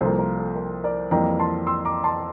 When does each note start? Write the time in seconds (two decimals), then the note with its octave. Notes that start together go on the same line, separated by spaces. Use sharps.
0.01 C2 C3 F3 A#3 A4 C5
0.19 A#4
0.38 A4
0.56 A#4
0.84 A#4 D5
1.11 F2 E3 G3 A#3 G5 A#5
1.39 A5 C6
1.67 C6 E6
1.85 A#5 D6
2.04 A5 C6